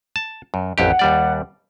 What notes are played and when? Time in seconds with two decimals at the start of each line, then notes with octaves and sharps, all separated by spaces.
0.16 A5
0.54 F#2
0.78 A1 F2 G4 F#5
0.99 D#2 G3 D5